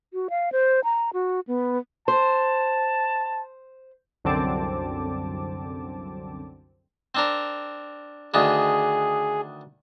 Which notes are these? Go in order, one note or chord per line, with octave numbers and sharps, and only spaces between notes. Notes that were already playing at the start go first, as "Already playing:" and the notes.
F#4
F5
C5
A#5
F#4
B3
C5 A5
C2 F#2 D3 C4 A5 D6
C4 D4 A#4
D2 D#3 D4 G#4